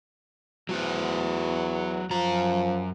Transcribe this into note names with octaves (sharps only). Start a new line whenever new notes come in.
E2 F#3 F#4 C5
F#2 F3 A#5